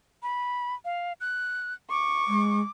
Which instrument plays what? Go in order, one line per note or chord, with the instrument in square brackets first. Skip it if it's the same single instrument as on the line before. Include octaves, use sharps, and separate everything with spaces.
[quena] B5
F5
F#6
[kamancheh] C#6 [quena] D6
[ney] G#3